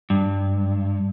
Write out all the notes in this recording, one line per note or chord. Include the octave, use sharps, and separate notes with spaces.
G2